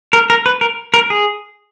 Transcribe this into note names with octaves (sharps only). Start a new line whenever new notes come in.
A#4
A#4
B4
A#4
A#4
G#4